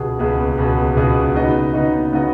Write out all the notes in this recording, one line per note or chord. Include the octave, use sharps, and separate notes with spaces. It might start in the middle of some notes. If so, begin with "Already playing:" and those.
Already playing: C#2 B2 B3 G#4
C#2 B2 B3 G#4
C#2 B2 B3 G#4
C#2 B2 B3 G#4
C#3 B3 D#4 F#4 D#5
C#3 B3 D#4 F#4 D#5
C#3 B3 D#4 F#4 D#5